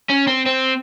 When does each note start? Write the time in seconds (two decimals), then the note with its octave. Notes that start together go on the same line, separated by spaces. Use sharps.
0.09 C#4
0.27 C4
0.46 C4